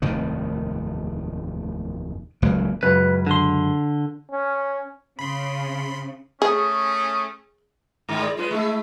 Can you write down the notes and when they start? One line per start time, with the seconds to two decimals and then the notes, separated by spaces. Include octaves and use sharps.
0.02 F1 D#2 A2 D#3
2.42 D#1 C#2 F#3 A#3
2.83 C#2 F#2 C#3 B4
3.27 D3 C6
4.32 C#4
5.19 C#3 B5 C6
6.42 A3 C#4 G#4 D#6
8.09 G#2 D#3 G#3
8.21 D5
8.37 G#3 C#4 F4 B4
8.51 G#3 A3 E4